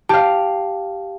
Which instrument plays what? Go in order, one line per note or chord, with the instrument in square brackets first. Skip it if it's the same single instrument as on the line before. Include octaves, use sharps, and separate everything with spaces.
[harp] G4 F5 [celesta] A5